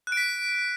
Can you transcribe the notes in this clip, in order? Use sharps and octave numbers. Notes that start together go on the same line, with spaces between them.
F#6
D7
B6